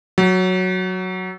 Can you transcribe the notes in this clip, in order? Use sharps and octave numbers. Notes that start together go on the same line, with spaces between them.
F#3